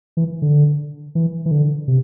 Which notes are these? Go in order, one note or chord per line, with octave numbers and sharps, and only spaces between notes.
E3
D3
E3
E3
D3
C3